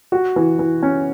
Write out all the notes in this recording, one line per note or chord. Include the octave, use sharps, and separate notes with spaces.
F#4
E3
E3
C#4